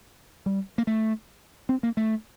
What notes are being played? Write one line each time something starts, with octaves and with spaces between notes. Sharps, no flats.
G3
A#3
A3
C4
A#3
A3